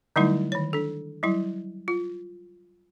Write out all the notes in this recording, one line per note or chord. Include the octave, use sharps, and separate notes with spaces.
D3 F#3 G3 A3 D#4 E4
D#3 C#5
D4 A4
F#3 G3 E4
F4